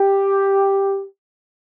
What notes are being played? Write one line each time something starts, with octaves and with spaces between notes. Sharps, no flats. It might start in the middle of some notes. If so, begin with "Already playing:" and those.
Already playing: G4